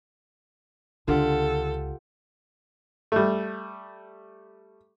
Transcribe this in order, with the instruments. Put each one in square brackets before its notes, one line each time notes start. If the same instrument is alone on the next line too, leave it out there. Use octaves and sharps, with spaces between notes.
[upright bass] C#2 [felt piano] D3 [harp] F4 G4 F#5 [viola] A4
[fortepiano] G3 A3